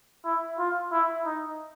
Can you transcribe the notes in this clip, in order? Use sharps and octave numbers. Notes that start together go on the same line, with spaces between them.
E4
F4
E4
D#4